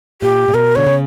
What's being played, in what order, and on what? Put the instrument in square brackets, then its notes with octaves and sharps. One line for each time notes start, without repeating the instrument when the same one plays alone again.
[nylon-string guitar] A#2 [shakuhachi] G4
[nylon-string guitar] A#2
[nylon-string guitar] B2 [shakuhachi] A#4
[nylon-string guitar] D3 [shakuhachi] C#5
[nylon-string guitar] C#3